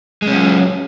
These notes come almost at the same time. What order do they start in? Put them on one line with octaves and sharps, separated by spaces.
G#3 C#4 F#3